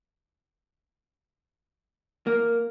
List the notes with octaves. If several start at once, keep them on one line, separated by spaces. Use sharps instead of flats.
A#3